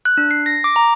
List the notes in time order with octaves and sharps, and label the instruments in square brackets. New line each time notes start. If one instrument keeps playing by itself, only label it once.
[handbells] F#6
D4
C7
A#6
D6
A#5